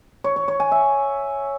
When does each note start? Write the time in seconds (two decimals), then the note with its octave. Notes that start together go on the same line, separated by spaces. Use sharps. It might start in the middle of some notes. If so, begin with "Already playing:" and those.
0.24 C#5
0.36 C#5
0.48 C#5
0.60 G#5
0.72 E5